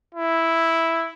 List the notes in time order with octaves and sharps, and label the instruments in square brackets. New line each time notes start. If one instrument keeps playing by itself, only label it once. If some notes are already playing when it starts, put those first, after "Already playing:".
[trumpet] E4